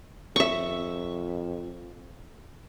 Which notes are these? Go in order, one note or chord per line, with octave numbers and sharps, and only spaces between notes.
F2 E5 C#6